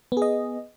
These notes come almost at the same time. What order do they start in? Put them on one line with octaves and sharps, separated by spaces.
B3 G#4 D#5